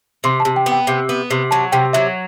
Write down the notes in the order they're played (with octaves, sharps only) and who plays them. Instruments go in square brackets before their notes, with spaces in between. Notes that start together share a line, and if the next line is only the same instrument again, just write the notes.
[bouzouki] C3 [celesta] C6
[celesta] A5
[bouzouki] C3
[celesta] G5
[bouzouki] B3
[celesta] G5
[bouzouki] C3
B3
C3
[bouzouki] F#3 [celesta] A5
[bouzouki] C3 [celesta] G5
[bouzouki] F#3 [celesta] E5